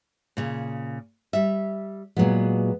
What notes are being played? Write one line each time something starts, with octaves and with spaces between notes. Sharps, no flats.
A#2 C#3
G3 E5
A#2 F#3 G#3 B3 G#4